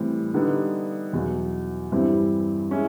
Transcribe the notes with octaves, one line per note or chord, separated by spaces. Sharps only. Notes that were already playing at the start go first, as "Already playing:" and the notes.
Already playing: A2 E3 G3 C4
D3 G3 B3 D#4
E2 B2 F#3
G2 E3 G3 C4 E4
G#3 C#4 E4